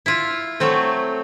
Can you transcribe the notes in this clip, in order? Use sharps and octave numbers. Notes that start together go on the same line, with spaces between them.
E4 F4
F#3 A3 C4